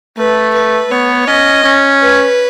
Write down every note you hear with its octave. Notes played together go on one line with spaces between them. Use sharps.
A3 B4
B4
B3 C#5
C#4 D#5
C#4
B4